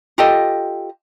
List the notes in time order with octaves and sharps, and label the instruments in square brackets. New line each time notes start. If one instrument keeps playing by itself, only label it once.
[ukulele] F4 G4 A4 D#5